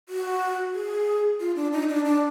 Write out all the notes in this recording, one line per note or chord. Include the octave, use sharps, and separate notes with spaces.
F#4
G#4
F4
D4
D#4
D4
D4